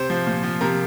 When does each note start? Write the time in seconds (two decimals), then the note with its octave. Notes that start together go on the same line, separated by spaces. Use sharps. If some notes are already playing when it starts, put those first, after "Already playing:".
Already playing: C3 C5
0.10 F3
0.27 A#2
0.43 F3
0.61 C3 A#4